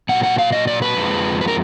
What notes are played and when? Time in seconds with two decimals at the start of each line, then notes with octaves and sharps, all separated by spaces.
0.09 A#2 F#3 F#5
0.23 F#5
0.38 F5
0.52 D#5
0.67 D5
0.82 B4
0.97 F2 F3 G#3
1.41 B4
1.48 A#4